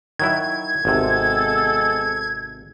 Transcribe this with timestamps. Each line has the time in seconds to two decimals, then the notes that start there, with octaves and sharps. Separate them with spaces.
0.19 D#3 F#3 E4 G#6
0.85 G#1 C3 G#3 B3 A4